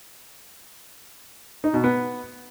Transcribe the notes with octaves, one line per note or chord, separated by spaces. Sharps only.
D#4
B2
B3